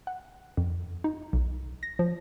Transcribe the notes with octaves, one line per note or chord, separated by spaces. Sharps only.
F#5
F2
D#4
B1
A#6
F3